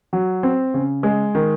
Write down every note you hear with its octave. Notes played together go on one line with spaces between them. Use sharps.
F#3
C4
C#3
G#3
D#3